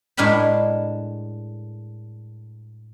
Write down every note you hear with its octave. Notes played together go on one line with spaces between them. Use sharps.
A2 G#3 D4 A#4 G5 B5